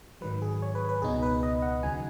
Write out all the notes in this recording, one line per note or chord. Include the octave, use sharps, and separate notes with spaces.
G#2 D#3 F#3 B4
G#4
C#5
B4
B4
C#2 B2 B3 D#4 G#4
B4
D#5
F#5
D#2 C#3 F#3 D#4 G#5